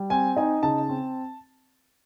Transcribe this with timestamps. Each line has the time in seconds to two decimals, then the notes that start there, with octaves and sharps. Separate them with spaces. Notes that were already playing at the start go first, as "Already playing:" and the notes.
Already playing: G3
0.10 C4 G#5
0.36 D#4 G#5
0.63 C#3 A5
0.89 C4